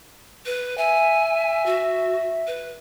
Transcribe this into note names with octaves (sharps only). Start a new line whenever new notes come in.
B4
E5 G#5
F#4
B4